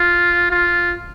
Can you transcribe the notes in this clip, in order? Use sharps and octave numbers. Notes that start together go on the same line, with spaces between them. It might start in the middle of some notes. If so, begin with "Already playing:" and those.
Already playing: F4
F4